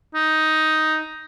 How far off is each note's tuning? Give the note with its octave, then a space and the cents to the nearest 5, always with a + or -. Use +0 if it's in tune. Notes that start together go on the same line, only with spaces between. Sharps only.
D#4 +5